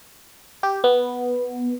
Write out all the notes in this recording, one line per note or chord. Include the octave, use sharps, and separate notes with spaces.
G4
B3